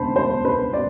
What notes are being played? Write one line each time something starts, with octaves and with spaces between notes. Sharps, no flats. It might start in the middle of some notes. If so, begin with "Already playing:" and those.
Already playing: E1 D2 C5 A5 B5
C5
B4
D5